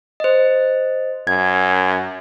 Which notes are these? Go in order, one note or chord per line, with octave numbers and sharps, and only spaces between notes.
C5 D#5
F#2 G#6